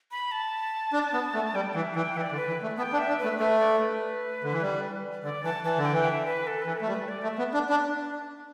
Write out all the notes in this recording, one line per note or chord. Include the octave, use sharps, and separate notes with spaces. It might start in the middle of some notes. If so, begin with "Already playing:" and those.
B5
A5
D4
B3
A3
G3 G5
E3 E5
E3 G5
E3 E5
D5
D3
B4
E3
A3
B3 A5
G5
D4
E5
D4
A3 B4
A3 B4 D5
D5
B4
D3
E3
G3
D3 D5
E3 A5
E3 A5
D3
G5
E3
E5
B4
A4
E3 B4
A3 A4
G3
B4
D5
A3
E5
B3
D4
D4 B5
A5